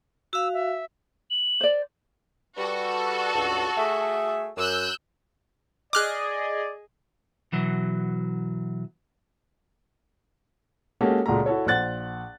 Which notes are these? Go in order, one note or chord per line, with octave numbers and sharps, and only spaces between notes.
F#4 F5 E6
E5
F#7
C5 D5
G3 F#4 A4 B4
C#2 G2
A3 G#4 E5
F#2 E6 F#6 G6
G#4 D5 D#5 D6 F6 F#6
B2 E3 F#3
G#3 A#3 C#4 F#4 G4 A4
C#2 A#2 G#3 F#4 A4 A#5
E4 F#4 A4 C#5
A#1 C5 F#5 F#6 A6